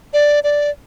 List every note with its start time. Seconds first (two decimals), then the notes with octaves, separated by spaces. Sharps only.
0.13 D5
0.44 D5